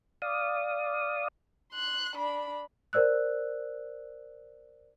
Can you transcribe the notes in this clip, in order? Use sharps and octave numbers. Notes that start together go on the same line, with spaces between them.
D5 F5 D#6
C6 F#6
D4 B5
A#4 C5 D5 E6 F#6